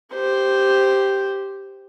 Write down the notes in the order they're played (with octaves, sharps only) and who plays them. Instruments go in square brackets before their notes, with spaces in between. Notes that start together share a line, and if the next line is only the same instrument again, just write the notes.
[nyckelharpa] G4 C5